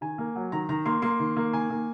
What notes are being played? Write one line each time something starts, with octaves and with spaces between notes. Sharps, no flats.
D#3 G#5
A#3
F#3
D#3 A#5
D#3 A#5
A#3 C6
A#3 C6
D#3
A#3
D#3 G#5
A#3